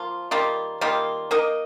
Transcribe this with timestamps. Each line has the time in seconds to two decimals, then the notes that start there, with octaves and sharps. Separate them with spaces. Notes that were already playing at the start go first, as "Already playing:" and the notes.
Already playing: F3 A#3 F4
0.31 D#3 G3 A#3 F4
0.81 D#3 G3 A#3 F4
1.31 A#3 D#4 A#4 D#5